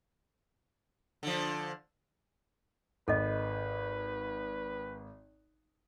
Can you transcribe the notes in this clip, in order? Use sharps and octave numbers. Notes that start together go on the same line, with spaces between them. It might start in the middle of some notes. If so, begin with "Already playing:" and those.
D3 F3
G#1 A4 B4 D#5